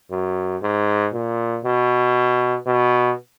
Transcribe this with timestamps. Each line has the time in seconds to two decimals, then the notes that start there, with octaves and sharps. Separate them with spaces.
0.11 F#2
0.62 G#2
1.14 A#2
1.65 B2
2.66 B2